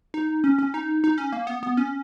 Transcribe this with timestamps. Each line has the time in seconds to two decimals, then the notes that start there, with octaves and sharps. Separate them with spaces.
0.14 D#4
0.44 C#4
0.59 C#4
0.74 D#4
1.04 D#4
1.18 C#4
1.32 A#3
1.47 B3
1.63 B3
1.77 C#4